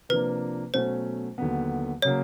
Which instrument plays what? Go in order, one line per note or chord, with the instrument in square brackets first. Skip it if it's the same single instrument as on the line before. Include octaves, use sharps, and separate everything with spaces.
[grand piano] C3 F3 A#3 D4 [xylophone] B4
[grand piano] B2 F#3 A3 C#4 [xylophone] C5
[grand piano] D#2 D3 F#3 B3
[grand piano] C#3 F#3 A#3 [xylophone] C#5